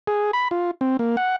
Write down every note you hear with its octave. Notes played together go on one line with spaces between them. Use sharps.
G#4
B5
F4
C4
A#3
F#5